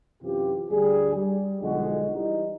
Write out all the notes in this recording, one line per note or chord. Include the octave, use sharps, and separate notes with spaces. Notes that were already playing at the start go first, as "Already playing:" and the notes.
F#2 C3 E3 F4 G4
D2 G2 G3 G#4
G3
B1 D3 F3 G#3 F#4 G#4
E3 G3 D#4